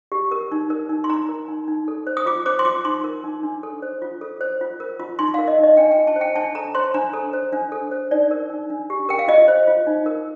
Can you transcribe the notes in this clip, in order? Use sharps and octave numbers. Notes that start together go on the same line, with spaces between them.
G4
A#4
D#4
A#4
D#4
C6
D#4 A#5
A#4
D#4
D#4
A4
C5
D#6
F4 D6
C5 D6
C6
F4 D6
D#4 C6
A#4
D#4
D4
A4
C5
F4
A4
C5
F4
A#4
F4
D#4 C6
A#4 F5
D#5
D#4 D#5
D4 G5
G5
F4
A5
C5
G5
D4 A5
A4 A#5
C5 C6
D4 A#5
A4
C5
D4
A4
C5
D#4 D5
A#4
D#4
D4
G4
A#4 G5
F5
F4 D#5
C5
F4
D#4
A#4